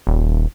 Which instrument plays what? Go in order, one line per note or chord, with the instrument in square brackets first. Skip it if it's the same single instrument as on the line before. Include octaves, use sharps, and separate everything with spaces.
[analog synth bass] D#1